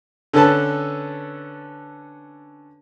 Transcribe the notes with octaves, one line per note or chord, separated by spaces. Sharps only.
D3 C#4 A4 B4 A5